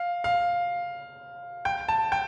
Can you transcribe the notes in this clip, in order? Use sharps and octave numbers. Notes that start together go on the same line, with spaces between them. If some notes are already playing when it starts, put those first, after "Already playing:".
Already playing: F5
F5
G5
A5
G5